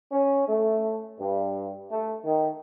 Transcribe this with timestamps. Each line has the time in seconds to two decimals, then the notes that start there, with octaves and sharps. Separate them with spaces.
0.11 C#4
0.48 A3
1.20 G2
1.91 A3
2.25 D#3